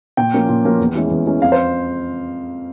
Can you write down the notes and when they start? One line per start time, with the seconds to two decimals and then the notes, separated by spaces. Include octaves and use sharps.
0.17 A#2 G5
0.33 F3 A#3 C#4
0.49 A#2
0.64 F3 A#3 C#4
0.80 E2
0.95 E3 G#3 C#4
1.11 E2
1.27 E3 G#3 C#4
1.42 F2 F5
1.52 C5